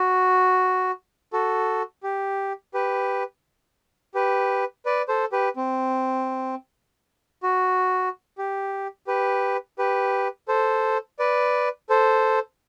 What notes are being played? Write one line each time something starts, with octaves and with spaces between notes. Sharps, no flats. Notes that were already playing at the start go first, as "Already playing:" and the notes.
Already playing: F#4
F#4 A4
G4
G4 B4
G4 B4
B4 D5
A4 C5
G4 B4
C4
F#4
G4
G4 B4
G4 B4
A4 C5
B4 D5
A4 C5